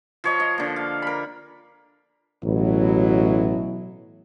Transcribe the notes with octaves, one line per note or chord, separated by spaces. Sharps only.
F3 C#5 D#5
D#5
D3 A#3
F5
A#4 B5
A1 B2 F#3 E4